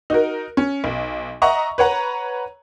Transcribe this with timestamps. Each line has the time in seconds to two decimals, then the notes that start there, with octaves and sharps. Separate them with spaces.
0.10 D#4 F#4 A#4
0.57 C#4
0.84 B1
1.42 D#5 E5 F#5 A#5 C#6
1.78 B4 C#5 F#5 A#5